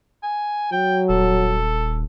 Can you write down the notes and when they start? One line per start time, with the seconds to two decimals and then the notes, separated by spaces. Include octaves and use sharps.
0.23 G#5
0.72 F#3 G5
1.09 D#1 A4